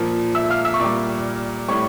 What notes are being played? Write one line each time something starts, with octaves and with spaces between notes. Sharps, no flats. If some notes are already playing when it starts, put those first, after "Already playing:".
Already playing: A#2 F3
E5 E6
F5 F6
E5 E6
C#6
A#2 G3 D5 D6
A2 G3 C#5 C#6